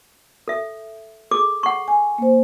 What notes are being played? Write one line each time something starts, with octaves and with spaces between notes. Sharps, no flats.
A4 E5
G#4 A4 D6
F#5 C#6
G#5
A#3 C5